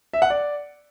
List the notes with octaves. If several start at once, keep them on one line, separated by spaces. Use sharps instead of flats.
E5
F#5
D5